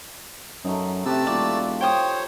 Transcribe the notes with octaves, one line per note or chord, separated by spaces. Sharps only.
F#2 A3 D#4
C3 A3 G4 B4 A5 E6
E1 F4 D5 C#6
C5 C#5 G5 D#6